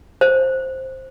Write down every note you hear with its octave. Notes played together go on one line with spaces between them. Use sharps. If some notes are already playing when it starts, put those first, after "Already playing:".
C5